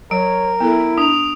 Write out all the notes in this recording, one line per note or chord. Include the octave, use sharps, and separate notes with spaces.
F#3 A#4 C#5 D7
B3 E4 A4
D4 D#6 F7